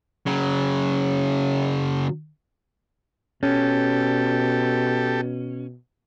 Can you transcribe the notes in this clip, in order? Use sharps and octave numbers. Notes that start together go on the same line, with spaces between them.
C#3 F#3
B2 C#4 G4 A4